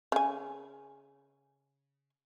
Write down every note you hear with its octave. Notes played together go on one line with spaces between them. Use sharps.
C#3 G#5